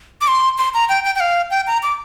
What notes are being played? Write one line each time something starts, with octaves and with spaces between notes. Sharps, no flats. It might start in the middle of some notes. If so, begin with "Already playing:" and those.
D6
C6
C6
A#5
G5
G5
G5
F5
G5
A#5
D6